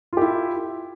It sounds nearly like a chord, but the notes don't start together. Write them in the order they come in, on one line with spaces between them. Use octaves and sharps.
F4 G4 E4